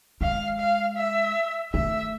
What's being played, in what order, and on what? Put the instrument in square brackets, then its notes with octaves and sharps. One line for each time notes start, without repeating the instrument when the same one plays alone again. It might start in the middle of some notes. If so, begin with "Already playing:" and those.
[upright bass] G#3 [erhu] F5
[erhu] F5
E5
[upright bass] A3 [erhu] E5